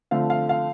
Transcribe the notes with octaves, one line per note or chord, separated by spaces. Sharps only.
D3 F3 A3 C4 F5
F5
F5